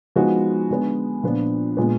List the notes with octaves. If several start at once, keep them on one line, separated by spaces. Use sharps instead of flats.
F3 G#3 B3 D#4 F#4
D3 G#3 B3
A#2 F3 B3 D4
A#2 G#3 B3